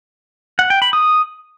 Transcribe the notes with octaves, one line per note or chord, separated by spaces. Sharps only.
F#5
G5
B5
D#6